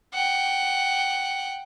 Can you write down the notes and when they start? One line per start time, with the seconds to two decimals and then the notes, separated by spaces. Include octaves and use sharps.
0.14 F#5 G5